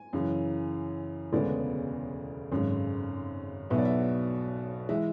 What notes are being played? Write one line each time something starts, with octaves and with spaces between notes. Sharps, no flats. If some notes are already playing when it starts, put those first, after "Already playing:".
Already playing: G#5
F#2 C#3 E3
E1 D2 C#3 G#3 B3 D5
G#1 F#2 C#3 G#3
B1 B2 F#3 B3 E5
D5
E5
E3 G#3 E5